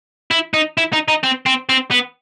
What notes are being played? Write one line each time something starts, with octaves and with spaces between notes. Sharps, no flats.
E4
D#4
E4
D#4
D#4
C4
C4
C4
B3